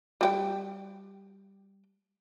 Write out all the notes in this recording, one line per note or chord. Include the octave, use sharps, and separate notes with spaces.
G3 G4 G5